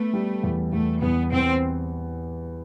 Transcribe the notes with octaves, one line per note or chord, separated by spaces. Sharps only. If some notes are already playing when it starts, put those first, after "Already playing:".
Already playing: A3 B3
G3
E2
E2 A3
E2 B3
E2 C4